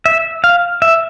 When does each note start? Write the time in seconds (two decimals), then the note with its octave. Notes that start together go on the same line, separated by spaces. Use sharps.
0.06 E5
0.44 F5
0.82 E5